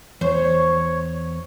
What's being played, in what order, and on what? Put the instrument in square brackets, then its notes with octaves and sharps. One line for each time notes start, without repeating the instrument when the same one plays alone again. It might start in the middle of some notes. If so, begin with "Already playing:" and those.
[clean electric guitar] E2 [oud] C5 [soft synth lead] C#5